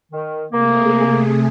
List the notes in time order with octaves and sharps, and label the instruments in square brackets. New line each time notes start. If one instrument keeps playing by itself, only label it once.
[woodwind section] D#3
[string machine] C3 A3 G#4 [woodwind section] A#3